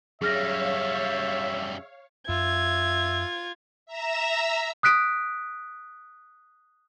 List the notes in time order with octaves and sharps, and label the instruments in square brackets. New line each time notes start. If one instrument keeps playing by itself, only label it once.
[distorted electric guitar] F#2 G3 [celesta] G#4 F6 A#6 [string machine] C#5 F5 [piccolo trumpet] E5
[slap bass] F#2 [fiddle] F4 [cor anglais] E5 [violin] G#6
[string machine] E5 A#5 E6
[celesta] D#6 F#6 B6 D7